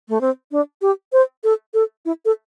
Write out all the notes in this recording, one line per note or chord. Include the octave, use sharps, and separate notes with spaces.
A3
C4
D4
G4
C5
A4
A4
E4
A4